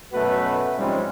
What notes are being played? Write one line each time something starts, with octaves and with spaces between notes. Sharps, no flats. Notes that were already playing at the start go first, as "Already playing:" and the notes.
F#2 B2 A3 F#4 B4
G#2 F3 G3 G#3 C4 C#4